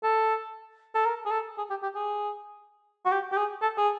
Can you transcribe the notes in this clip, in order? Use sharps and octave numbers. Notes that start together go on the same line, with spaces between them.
A4
A4
A#4
G#4
A4
G#4
G4
G4
G#4
F#4
G4
G4
G#4
A4
G#4